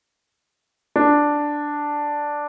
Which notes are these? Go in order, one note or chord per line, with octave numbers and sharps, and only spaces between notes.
D4